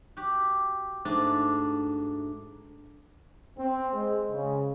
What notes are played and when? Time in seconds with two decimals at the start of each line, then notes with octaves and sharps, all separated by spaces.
0.17 F#4 G4
1.05 G#2 A3 D4 F#4
3.58 C4
3.93 G#3
4.30 C#3